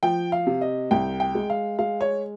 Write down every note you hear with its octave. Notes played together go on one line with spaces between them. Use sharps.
F3 G5
F5
C3
D#5
C2 G5
G5
G#3
F5
G#3 F5
C#5